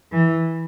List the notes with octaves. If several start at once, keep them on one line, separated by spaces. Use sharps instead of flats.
E3